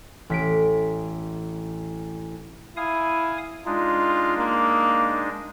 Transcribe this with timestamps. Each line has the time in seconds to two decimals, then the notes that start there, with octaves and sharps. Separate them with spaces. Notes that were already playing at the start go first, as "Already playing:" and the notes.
0.30 A1 B6 D7
2.77 E4 F5 G#5 D#6
3.66 G#3 D4 D#4 F4
4.38 A#3